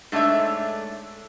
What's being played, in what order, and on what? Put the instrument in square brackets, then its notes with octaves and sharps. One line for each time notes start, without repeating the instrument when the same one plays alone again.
[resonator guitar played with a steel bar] G#2 A3 D4 C#5 E5